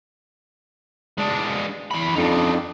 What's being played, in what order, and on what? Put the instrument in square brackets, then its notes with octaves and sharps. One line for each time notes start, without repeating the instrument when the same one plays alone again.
[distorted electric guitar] G#3 D4
E2 B5
[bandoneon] F2 [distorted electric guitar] D4 D#4